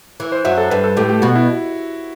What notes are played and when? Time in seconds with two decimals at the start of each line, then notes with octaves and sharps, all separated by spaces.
0.20 E3
0.32 C5
0.45 F#2 F#3 E5
0.58 A4
0.70 G2 G3 B4
0.84 A4
0.97 A2 A3 G4
1.10 G4
1.22 B2 B3 F#4
1.35 E4